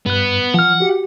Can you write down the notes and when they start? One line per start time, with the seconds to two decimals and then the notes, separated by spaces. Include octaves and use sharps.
0.06 G2 B3 F#6
0.54 F3 F#5 F6
0.80 F#4 G4